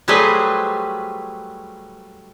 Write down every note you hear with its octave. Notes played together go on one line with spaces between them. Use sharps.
F#3 G3 A3 G#4 B4 C5